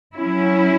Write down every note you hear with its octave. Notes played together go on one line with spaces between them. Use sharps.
F#3 C#4 E4